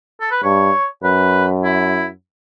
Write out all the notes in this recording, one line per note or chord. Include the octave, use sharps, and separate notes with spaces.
A4
B4
G2 C#5
F#2 B4
E4